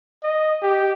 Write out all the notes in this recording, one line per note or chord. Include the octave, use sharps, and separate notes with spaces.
D#5
G4